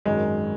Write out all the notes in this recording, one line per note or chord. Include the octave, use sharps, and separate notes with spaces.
G#1 F#2 D#3 G#3